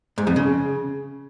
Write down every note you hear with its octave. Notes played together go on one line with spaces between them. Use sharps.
G#2
F2
C#3